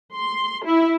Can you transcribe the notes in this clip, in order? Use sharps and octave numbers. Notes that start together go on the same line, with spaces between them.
C6
E4